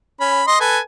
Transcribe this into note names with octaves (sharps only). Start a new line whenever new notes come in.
C#4 B5
D#5 C6
A4 B4 G#5